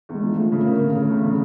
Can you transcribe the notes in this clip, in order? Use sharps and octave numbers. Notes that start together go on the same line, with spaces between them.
E2 G#3
F3
F3 A3
C#3 A3
A#3
C#3
C#3
E2
C#3